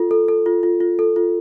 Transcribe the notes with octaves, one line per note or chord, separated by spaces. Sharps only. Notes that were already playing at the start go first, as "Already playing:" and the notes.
Already playing: F4 A4
A4
A4
F4
F4
F4
A4
F4